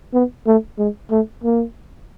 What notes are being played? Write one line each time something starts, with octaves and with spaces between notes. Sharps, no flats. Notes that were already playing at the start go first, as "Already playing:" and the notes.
B3
A3
G#3
A3
A#3